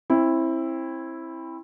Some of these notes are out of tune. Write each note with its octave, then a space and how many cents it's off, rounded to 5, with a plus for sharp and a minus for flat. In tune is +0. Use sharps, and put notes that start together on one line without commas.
C4 +30 E4 +0